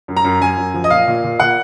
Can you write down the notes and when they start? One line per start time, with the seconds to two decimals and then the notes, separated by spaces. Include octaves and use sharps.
0.08 F#2
0.17 A#5
0.24 F#2
0.41 F#2 G#5
0.58 F#2
0.74 F3
0.84 D#5
0.90 A#2 F5
1.07 A#2
1.24 A#2
1.40 A#2 F#5